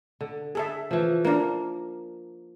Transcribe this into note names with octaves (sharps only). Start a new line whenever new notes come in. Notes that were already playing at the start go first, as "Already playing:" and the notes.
D3
G#4 A4 E5
E3 F3
A#3 D4 A#4